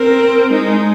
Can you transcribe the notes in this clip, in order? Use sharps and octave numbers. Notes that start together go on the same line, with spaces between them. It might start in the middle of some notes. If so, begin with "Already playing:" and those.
Already playing: C4 A#4
G#3 D#4